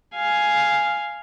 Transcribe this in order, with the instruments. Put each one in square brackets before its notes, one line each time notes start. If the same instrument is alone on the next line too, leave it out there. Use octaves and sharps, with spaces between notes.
[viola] F5 G#5